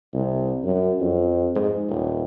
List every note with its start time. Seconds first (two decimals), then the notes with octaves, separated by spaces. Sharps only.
0.14 C2
0.64 F#2
1.00 F2
1.55 G#2
1.89 D#1